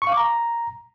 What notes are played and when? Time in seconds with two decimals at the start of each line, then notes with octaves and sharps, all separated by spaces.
0.02 C#6
0.07 F5
0.12 D6
0.17 A#5